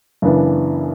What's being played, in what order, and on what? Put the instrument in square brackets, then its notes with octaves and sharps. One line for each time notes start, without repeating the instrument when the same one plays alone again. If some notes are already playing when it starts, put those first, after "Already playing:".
[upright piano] F#2 C#3 E3 B3 D4